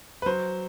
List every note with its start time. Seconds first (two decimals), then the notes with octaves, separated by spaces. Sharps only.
0.22 B4
0.26 F#3 C5